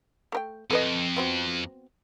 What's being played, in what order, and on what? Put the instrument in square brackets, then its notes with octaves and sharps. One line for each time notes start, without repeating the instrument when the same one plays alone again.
[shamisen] A3 A#4 G5
[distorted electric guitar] F2 [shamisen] A4 B4 D#5
[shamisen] B3 C4 F#4